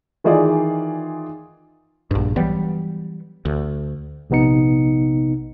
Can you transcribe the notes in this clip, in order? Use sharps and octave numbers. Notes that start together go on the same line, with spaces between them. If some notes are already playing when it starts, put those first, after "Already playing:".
D#3 E3 D#4 F4 G#4 D5
A#1 G2
E3 F#3 G3 B3
D2
A#1 C3 B3 D#4 C#7